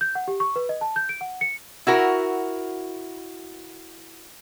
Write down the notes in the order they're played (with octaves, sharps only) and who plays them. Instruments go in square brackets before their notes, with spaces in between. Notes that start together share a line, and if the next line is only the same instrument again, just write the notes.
[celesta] G6
F#5
G4
C#6
B4
D#5
A5
G6
D7
F#5
C#7
[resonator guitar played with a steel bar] E4 F#4 A#4